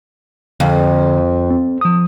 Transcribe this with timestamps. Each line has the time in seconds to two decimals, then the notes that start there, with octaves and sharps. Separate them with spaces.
0.60 F2 D3 F5
1.51 C4
1.81 F3 D#6